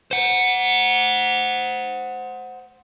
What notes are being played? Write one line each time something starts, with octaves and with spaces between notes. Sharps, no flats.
C5 F#5